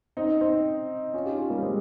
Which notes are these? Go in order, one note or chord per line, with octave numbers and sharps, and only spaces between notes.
C4 D#4
C4 D#4
C#4 F4
D#4 G4
C#4 F4
G3 A#3
G#3 C4